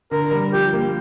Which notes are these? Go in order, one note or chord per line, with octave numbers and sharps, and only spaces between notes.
D3 A#4
G3 A#4
F3 G4
A#3